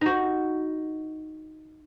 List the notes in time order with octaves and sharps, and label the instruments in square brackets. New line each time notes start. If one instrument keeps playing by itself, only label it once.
[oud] D#4 F#4